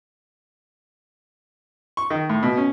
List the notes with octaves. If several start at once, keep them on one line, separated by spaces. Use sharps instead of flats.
C#6
D#3
A2
B2
C#4